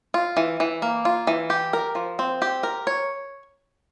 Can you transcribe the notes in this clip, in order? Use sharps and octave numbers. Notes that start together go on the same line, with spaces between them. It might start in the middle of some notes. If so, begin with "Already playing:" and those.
F4
E3
E3
A#3
F4
E3
G4
A#4
F3
C4
G4
A#4
C#5